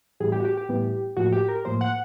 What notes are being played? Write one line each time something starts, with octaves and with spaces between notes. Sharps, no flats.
A2 E3 G3 B3 G#4
G4
F#4
G4
G4
A2 E3 G3 B3
A2 F3 A#3 F#4
G4
A#4
A2 F3 A#3 C5
F#5